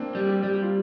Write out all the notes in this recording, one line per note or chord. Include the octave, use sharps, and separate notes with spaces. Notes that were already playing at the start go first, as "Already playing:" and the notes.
Already playing: A#3 C4 D4
G3
G4
G3
G4
F4